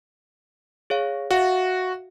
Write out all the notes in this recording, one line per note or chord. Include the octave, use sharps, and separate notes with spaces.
G#4 C#5 F5
F#4 E5 F5